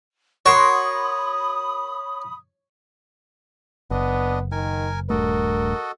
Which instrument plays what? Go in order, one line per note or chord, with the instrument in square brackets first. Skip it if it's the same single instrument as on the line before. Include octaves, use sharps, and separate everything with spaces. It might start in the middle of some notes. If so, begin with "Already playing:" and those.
[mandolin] F#4 A#4 C6 [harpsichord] C#5 [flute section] B5 D#6
[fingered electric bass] F#1 [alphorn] B3 [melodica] D4 D#5
[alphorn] D#3 [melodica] A#4 G#5
[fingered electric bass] D#1 G2 A3 [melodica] F#4 A4 D#5 [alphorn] A#4